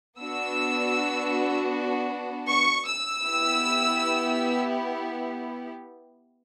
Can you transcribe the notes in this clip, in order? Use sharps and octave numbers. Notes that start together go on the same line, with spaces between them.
B3 D4 F#4 E6
C#6
E6
B3 E4 G4